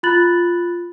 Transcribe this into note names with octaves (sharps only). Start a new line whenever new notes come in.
F4 B5 F#6 A6 F#7